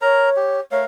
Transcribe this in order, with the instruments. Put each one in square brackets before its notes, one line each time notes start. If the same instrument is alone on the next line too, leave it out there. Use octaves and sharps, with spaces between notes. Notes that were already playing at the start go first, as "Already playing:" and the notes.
[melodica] A#4 A#5 [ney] C#5
[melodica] G4
[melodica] A3 A#4 F5 [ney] C#5